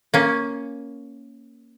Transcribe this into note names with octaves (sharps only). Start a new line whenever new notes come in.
A#3 C#4